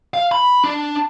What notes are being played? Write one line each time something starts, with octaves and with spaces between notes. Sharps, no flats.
F5
B5
D4